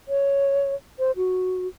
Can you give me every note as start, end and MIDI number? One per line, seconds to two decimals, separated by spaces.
0.08 0.75 73
0.99 1.11 72
1.16 1.67 66